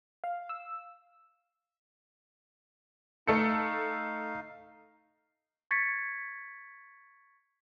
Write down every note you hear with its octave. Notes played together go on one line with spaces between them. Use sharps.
F5
E6
A3 D#4 A4 F5 C#7
C#6 G#6 A6 B6 C#7